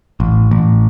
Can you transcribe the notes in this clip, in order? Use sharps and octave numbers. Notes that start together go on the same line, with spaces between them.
A1
A1